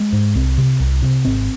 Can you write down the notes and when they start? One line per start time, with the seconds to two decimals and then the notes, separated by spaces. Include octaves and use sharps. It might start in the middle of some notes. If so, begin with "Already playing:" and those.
Already playing: G#3
0.13 G#2
0.35 C2 C4
0.58 C3
0.80 C2
1.02 C3
1.25 G#1 C4